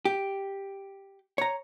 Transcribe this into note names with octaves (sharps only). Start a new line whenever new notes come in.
G4
C#5 A#5